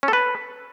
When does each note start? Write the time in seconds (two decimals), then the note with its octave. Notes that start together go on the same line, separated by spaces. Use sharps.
0.03 C#4
0.08 A4
0.13 B4